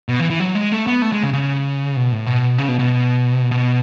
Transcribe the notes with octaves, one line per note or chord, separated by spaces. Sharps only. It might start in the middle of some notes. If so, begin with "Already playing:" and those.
B2
E3
E3
F#3
G#3
A3
B3
A3
G#3
C#3
C#3
B2
A2
B2
C#3
B2
B2
B2